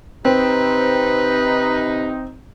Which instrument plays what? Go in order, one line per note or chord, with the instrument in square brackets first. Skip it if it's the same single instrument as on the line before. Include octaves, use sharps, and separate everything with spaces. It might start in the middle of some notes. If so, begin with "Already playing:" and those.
[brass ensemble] C3 D#4 [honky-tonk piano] C4 [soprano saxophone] B4